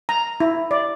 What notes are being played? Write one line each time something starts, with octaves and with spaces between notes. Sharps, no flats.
A#5
E4
D5